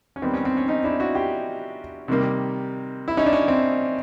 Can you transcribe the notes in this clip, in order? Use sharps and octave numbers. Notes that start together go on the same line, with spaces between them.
C#4
D#3 G3 B3 C4
C#4
C4
C#4
C#4 D#4
D4 E4
E4 F#4
F4 G4
C3 D#3 G3 A#3
E4
C#4 D#4
D4
C#4
C4